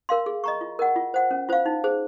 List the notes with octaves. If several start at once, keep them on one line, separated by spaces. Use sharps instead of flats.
A#4 F5 C6
G#4
D#5 A#5 C#6
F4
A#4 D#5 F#5
F4
C5 F#5
C#4
F4 C5 F5
D#4
G#4 C5